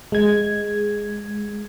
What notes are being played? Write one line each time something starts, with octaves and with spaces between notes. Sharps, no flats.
G#3 G#6